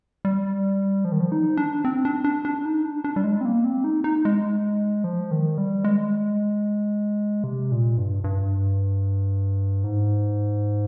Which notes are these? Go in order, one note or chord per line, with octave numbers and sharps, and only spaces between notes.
G3
F3
D#3
F3
D#4
D4
C4
D4
D4
D4
D#4
D4
D4
G3
G#3
C4
A#3
C4
D#4
D#4
G#3
F3
D#3
G3
G#3
C3
A#2
G2
G2
G#2